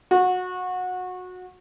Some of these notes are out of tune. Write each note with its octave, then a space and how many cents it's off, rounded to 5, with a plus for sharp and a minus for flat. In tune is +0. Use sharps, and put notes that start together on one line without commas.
F#4 -20